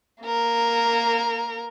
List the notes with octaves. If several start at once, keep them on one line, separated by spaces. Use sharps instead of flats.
A#3 A#4